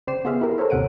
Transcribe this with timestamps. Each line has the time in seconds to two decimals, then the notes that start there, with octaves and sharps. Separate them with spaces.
0.07 C#3 C5 D5 G5 C7 E7
0.25 B3 F4 G#4 E5 F5
0.41 E4 G4 A#4
0.58 A4 A#4 C5 C#5 E5
0.70 G1 D#2 C3 F#5 D7 D#7